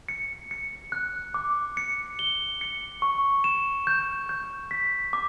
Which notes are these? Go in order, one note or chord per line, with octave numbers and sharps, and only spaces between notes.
C#7
C#7
F#6
D6
C#7
G7
C#7
C#6
E7
G6
G6
B6
D6